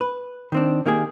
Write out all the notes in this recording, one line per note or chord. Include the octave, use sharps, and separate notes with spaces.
B4
D#3 C4 D4
D#3 A#3 G4 G#4